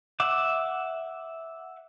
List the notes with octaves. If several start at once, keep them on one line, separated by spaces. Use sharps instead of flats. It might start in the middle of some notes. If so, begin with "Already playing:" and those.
E5 F#5 D6